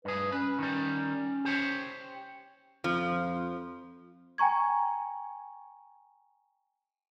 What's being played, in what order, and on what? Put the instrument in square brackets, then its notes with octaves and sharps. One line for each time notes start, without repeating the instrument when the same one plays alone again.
[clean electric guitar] G2 G#4 [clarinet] B4
[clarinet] C#4 [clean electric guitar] B4
[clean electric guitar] D#3 G3
G4 C5 C#5
[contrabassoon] F2 [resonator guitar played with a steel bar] F3
[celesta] G5 G#5 A#5 C#6 G#6